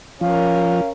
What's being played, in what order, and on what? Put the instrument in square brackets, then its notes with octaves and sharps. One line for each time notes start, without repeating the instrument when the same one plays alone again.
[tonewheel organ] F3 [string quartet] C#4 A#4 [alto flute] F5